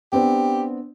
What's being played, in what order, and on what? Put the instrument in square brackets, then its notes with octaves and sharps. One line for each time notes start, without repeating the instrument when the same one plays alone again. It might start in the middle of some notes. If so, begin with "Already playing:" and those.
[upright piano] B3 C4 D4 [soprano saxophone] G4